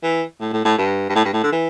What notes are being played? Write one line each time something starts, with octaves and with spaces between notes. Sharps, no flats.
E3
A2
A2
A2
G2
G2
A2
G2
A2
D3
E3